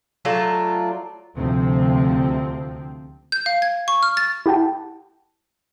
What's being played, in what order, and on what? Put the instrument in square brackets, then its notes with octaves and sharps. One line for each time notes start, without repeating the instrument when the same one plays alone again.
[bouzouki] F#3 A3 D4 F4
[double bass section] D2 C3 F3 C4
[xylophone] G6
F5
G#6
C#6
F6
A6
[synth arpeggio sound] E4 G4 F#5 G5 A5